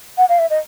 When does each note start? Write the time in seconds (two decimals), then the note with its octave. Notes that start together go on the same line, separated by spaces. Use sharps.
0.18 F#5
0.29 F5
0.39 E5
0.50 D#5